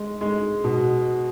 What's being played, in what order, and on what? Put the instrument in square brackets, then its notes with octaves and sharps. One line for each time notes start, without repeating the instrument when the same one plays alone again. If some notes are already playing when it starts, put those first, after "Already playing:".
Already playing: [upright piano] G#3
G#3
B2